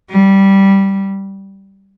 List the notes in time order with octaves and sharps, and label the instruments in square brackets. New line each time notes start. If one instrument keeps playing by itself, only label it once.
[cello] G3